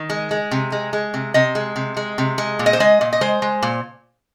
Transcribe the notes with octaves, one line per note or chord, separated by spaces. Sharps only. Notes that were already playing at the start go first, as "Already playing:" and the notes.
Already playing: D#3
G#3
G#3
C3
G#3
G#3
C3
C3 D#5
G#3
C3
G#3
C3
G#3
A#2
D#5
C5
G#3 D#5
A#2
D#5
G#3 C5
G#3
A#2